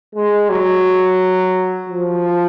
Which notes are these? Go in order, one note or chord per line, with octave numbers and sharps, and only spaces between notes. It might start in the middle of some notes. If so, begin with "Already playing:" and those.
G#3
F#3
F3